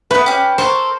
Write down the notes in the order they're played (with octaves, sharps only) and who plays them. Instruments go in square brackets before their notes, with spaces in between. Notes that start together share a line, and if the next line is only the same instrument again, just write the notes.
[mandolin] A3 B3 [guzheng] B4
[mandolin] C#4 G4
[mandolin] A4 A#4 C#6 [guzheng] C5